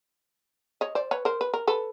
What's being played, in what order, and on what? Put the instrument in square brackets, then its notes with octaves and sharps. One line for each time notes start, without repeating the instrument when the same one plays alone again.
[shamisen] C#5 D#5
C5 D5
B4 C#5
A#4 C5
B4
A#4
A4 B4